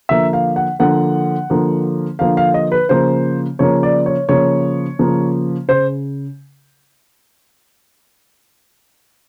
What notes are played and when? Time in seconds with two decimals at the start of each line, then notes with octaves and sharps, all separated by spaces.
0.09 D3 F3 A#3 E5
0.33 F5
0.56 F#5
0.79 D3 F3 A#3 F#5
1.50 D3 F3 A#3
2.19 D3 F3 A#3 F5
2.37 F5
2.54 D#5
2.72 B4
2.89 C#3 F3 A#3 C5
3.59 C#3 F3 A#3 C#5
3.83 D5
4.06 C#5
4.29 C#3 F3 A#3 C#5
4.99 C#3 F3 A#3
5.68 C#3 C5